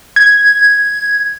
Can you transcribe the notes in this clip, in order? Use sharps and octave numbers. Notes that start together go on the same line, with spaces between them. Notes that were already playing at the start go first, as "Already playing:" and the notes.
G#6